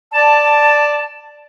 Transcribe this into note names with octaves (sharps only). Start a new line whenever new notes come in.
D5 A5